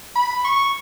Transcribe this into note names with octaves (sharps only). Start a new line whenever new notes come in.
B5
C#6